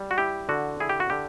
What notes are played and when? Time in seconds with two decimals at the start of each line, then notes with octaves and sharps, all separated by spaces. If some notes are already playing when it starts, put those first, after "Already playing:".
Already playing: G3
0.11 F#4
0.18 E4 G4
0.49 D3 F#4
0.80 E4 G#4
0.89 G4
1.00 F#4
1.10 D3 G4